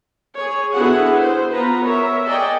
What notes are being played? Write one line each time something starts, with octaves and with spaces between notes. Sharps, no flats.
G#4 C#5
D3 B3 E4 F#4 G#4 F#5
C5
B3 F4 B4 A#5
A#4 C#5 E5
G#4 D5 D#5 F#5 G5